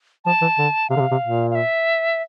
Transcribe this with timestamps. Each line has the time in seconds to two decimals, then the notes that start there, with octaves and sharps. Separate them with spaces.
0.25 F3 A5
0.41 E3
0.58 D3
0.90 C3 F5
0.96 D3
1.00 C3
1.11 C3
1.22 A#2
1.50 F5
1.55 E5